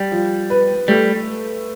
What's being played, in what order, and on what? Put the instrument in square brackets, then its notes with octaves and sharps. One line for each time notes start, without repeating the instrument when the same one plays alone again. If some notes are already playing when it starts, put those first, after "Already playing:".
Already playing: [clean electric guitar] G3
[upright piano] F3
B4
[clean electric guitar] G3 [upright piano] A3